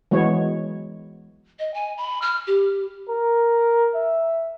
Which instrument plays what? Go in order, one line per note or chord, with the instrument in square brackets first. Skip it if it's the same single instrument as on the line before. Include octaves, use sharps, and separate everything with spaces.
[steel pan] E3 F#3 G#3 B3 C#5
[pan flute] D#5
G#5
B5
F6
G4
[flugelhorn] A#4
E5